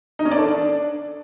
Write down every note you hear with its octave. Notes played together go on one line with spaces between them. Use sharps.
D#4
C#4
D5
A4
D4